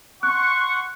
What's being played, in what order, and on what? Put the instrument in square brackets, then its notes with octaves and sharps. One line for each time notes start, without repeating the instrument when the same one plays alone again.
[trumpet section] F#5 C6 C#6 [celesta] F#6